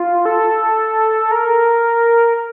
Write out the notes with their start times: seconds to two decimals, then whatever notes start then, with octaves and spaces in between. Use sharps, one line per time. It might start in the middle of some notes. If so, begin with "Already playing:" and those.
Already playing: F4
0.25 A4
1.31 A#4